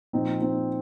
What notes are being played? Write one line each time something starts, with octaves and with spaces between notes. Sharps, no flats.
A#2 F3 C4 D#4
C4 D#4